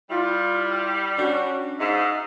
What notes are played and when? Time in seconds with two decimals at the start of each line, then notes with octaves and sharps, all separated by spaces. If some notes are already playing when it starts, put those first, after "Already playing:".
0.11 G3 E4 F4
1.19 C#4 D4 F#4
1.80 G#2 D#4 E5